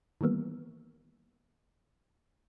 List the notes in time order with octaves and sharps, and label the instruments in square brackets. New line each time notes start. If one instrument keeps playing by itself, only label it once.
[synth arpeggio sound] D#3 E3 G3 A#3 B3